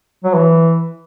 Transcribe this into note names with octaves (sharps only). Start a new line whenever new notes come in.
F#3
E3